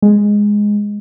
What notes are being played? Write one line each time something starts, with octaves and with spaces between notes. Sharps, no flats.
G#3